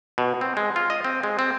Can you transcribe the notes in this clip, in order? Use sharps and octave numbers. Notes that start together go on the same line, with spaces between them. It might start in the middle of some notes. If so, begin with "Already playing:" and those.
B2
C4
G#3
F4
D#5
C4
G#3
C4